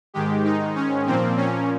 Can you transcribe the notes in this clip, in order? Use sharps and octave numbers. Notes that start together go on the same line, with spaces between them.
G#2 D#3 G#3 G4
D#4
C#4
A#2 F3 A#3 C4
C#4